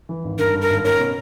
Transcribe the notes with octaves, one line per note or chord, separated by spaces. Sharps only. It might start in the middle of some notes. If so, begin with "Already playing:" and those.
E3
G#1
G2 A#4
G2
A#4
G#1
C#4 A#4
B2